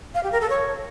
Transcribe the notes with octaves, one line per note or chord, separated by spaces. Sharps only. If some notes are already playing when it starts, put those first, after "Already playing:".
F5
G4
A#4
A4
C#5